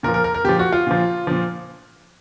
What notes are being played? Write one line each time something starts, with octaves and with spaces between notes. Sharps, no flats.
A#2 F3 A#4
A#4
A#4
A#4
A#2 F3 G4
F#4
F4
A#2 F3
A#2 F3